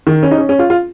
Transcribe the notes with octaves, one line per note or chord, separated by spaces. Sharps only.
D#3
C#4
D#4
C#4
C#4
F4
F4